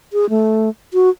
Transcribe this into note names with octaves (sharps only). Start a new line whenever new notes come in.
G#4
A3
F#4